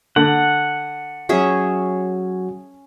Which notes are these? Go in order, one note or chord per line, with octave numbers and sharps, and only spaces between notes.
D3 F#5
F#3 C#4 F#4 G#4 E5